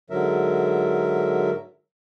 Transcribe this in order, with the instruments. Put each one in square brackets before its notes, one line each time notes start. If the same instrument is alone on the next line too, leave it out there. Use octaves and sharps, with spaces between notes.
[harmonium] G#2 D3 F#3 A#4 E5